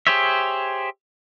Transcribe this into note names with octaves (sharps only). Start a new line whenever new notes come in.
G4 G#4 C5 C#5 E5